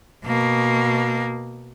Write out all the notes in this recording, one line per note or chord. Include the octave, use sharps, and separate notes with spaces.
B2 A#3